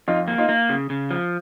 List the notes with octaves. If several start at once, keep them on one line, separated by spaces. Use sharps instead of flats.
F2 D#4 F4
A#3
D#4 F4
A#3
C#3
C#3
F3